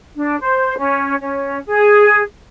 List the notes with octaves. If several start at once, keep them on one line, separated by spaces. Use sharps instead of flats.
D4
C5
C#4
C#4
G#4